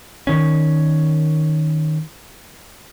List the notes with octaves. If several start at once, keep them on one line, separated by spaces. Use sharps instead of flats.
D#3 C#4